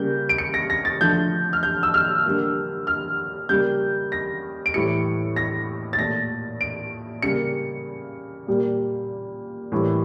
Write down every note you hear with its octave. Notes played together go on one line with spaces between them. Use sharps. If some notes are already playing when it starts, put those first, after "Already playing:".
Already playing: C#3 G3 A#3 G6
D7
C#7
A#6
A#6
A6
D3 F3 A3 G6
F6
G6
E6
F6
D3 G3 A#3
F6
C#3 G3 A#3 G6
A#6
D7
A2 E3 G3 C#7
A#6
A6
A#2 A3 A#6
D7
C#3 G3 A#3 C#7
A#2 G3 A#3
A2 E3 G3 A#3